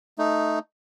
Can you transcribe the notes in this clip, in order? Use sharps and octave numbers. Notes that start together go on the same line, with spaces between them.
A3 D#4